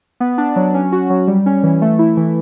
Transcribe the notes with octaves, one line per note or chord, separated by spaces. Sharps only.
B3
D4
F#3
C#4
F#4
F#3
G3
C#4
E3
A3
E4
E3